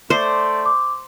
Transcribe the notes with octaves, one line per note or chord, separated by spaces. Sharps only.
A3 C5 D5
D6